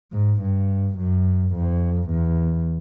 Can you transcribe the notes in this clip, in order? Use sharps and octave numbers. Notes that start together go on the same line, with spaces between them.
G#2
G2
F#2
F2
E2